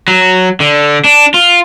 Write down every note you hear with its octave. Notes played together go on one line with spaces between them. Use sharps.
F#3
D3
D4
F4